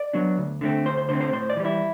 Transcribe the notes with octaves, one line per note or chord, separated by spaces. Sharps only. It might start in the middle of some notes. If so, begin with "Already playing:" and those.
Already playing: D5
F#3 B3 D4
D2
D3 A3 C4
D2 C5
C5
D3 A3 C4 C5
C5
A2 C5
D5
E3 G3
E4